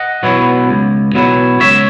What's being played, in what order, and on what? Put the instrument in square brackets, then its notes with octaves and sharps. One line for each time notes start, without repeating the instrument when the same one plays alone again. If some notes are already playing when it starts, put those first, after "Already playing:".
Already playing: [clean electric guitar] D#5 F#5
B2 F#3 B3 E4
C#2
B2 F#3 B3 E4
C#2 C#5 E5